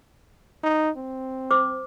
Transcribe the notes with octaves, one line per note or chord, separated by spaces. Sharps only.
D#4
C4
C5 D6